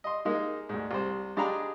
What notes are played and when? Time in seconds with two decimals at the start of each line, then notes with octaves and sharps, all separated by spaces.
0.04 D#5 C6
0.25 G#3 A#3 D#4
0.69 D2 G#2
0.91 C2 C5
1.37 G#3 D4 G4 G#4 A#5 B5